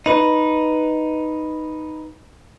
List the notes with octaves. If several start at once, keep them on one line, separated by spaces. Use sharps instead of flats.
D#4 B4